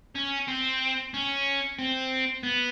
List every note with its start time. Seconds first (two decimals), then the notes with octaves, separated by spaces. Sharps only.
0.15 C#4
0.48 C4
1.14 C#4
1.79 C4
2.43 B3